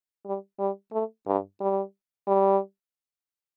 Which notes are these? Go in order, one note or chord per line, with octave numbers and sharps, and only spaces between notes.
G3
G3
A3
G2
G3
G3